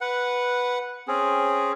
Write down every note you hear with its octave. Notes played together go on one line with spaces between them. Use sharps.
B4 F#5
C4 C#4 G#4